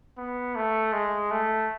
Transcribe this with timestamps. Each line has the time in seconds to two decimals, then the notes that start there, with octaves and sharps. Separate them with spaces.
0.18 B3
0.55 A3
0.93 G#3
1.31 A3